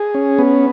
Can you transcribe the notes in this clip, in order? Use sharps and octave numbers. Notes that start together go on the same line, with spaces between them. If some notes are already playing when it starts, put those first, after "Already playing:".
Already playing: G#4
C#4
B3